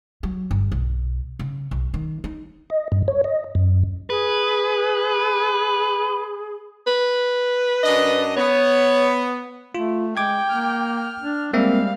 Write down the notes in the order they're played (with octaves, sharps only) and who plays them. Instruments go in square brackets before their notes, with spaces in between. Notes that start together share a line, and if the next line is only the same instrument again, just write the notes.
[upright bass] F#3
G1
B1
C#3
B1
D#3
D#4
[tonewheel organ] D#5
G2
C#5
D#5
F#2
[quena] G#4 [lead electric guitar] B4
[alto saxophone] B4
[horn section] F#2 D4 D#5
[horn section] B3 [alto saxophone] C#5
[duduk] A3 [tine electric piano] F4
[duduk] G#3 [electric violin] G5 [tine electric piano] D6 G#6
[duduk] A#3 [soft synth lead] F6
[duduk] D4
[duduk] G3 [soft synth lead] G#3 [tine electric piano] A#3 C4 E5 [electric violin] F5